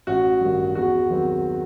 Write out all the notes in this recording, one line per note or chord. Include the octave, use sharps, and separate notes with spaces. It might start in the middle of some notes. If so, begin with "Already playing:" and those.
A1 F#4
G2 D#3
E2 F#4
D#3 F#3 C4